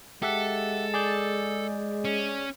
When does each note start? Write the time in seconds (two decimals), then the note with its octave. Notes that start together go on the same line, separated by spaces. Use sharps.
0.23 G#3 G4 A4 E5 F#5
0.94 G#4 D5 G6
2.05 C#4